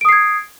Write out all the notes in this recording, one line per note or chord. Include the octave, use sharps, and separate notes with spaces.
D#6 G#6 C7 D7